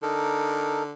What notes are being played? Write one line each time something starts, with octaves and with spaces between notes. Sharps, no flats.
D3 D#4 A4 A#4